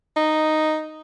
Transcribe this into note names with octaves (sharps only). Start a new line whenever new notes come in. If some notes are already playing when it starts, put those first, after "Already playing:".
D#4